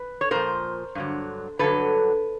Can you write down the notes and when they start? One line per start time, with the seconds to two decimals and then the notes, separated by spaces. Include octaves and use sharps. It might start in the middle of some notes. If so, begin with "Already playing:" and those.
Already playing: B4
0.21 C#5
0.31 A#2 F3 A#4 C5
0.95 G2 D3 F#3
1.59 G2 D3 F#3 A4 B4